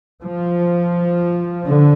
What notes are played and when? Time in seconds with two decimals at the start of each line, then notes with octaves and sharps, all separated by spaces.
0.22 F3
1.65 D3